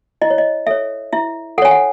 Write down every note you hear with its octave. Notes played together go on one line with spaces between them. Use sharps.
E4 D#5
C#5
D#5
A4 C#5 E5
E4 E5
A4 C#5 F#5 G#5
F#5